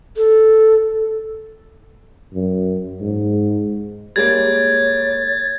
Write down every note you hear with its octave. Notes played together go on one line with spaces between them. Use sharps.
A4
F#2
G#2
G3 G#3 A#3 C#5 G#6 A6